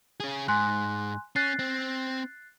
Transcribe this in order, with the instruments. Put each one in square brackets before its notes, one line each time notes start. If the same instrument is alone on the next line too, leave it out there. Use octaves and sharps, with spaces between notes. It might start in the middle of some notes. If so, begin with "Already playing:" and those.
[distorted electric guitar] C#4 G#4
[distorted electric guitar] G#2 [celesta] G#5 C6 F#6
[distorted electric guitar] C#4 [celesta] F#6 A6 C7
[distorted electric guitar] C4